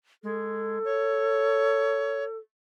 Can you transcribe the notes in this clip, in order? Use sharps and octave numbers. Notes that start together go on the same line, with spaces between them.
G#3 A4
C#5